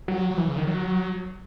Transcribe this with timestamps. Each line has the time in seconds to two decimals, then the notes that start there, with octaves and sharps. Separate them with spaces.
0.08 F#3
0.30 F#3
0.37 E3
0.47 C#3
0.57 D#3
0.67 F#3